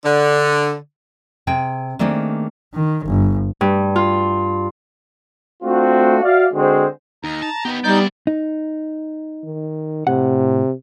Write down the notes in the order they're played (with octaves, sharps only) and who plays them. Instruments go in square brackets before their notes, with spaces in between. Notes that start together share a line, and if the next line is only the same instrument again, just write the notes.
[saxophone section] D3
[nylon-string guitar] C3 G#4 G5
D#3 A3 A#3 C4 D4 G#4
[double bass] D#3
G1
[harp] G2
F4
[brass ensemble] A3 C4 D4 F4 F#4
F#4 D5 E5 F5
D3 G#3 C4 F#4 C5
[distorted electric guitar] D#2 [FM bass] D#4 [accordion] A#5
[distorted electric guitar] A5
[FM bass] B3 [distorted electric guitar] D#4 G4
[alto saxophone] G3 [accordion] D#4 G6 [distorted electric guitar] E4 D5
[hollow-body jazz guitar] D#4
[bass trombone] D#3
[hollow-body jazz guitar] A2 F#5 [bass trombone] C3